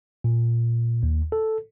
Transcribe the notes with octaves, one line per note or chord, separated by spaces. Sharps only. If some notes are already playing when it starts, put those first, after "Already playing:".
A#2
D#2
A4